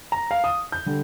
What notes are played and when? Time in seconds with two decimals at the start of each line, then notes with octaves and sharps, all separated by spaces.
0.12 A#5
0.31 F5
0.44 D#6
0.72 G6
0.86 D3 G3